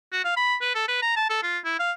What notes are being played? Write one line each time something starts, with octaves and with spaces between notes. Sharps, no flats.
F#4
F5
B5
B4
A4
B4
A#5
A5
A4
F4
E4
F5